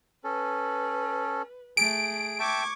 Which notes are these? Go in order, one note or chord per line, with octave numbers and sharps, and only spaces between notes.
C#4 A4 B4
A3 G#4 D7
E5 G5 A5 C#6 D6 G#6